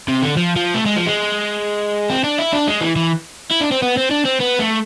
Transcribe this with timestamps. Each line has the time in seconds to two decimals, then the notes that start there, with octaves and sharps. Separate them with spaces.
0.08 C3
0.22 D3
0.37 F3
0.56 F3
0.74 A3
0.86 G#3
0.96 F3
1.06 G#3
2.10 C4
2.24 D4
2.38 E4
2.53 D4
2.68 G#3
2.81 E3
2.96 E3
3.51 E4
3.61 D4
3.71 C4
3.82 B3
3.97 C4
4.11 D4
4.26 C4
4.41 B3
4.60 A3